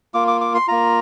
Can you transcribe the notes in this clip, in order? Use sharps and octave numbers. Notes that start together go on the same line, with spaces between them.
A#3 F4 D6
D6
D6
C6
A#3 F4 A#5